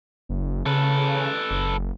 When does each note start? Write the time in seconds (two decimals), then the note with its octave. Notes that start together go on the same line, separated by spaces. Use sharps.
0.29 F#1
0.66 C#3 A4 B4
1.50 F#1